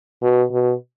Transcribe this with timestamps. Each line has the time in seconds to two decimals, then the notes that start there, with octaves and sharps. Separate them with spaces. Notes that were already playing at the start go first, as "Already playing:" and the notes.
0.22 B2
0.51 B2